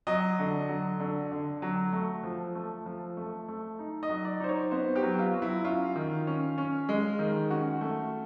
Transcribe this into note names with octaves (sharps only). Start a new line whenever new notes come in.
F#3 D#5
D3
F#3
D3
D3
F#3
A3
F3
A3
F3
A3
A3
D#4
D#5
F#3
D5
D#4 C5
C#5
B3 C5
G4
F#3
F4
F#3
E4
C#4 F4
D#3
C#4
C#4
G#3
D#3
C#4 F#4
A3